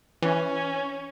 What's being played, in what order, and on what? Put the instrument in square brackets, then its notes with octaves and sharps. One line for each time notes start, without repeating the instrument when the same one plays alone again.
[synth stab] E3 [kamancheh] C#4